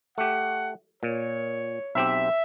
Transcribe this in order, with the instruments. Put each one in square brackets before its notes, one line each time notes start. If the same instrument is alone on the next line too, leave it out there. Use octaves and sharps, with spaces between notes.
[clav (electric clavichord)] A3 G4 [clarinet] F#5
[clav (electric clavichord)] A#2 [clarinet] C#5
[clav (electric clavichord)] B1 C4 G4 [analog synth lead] E5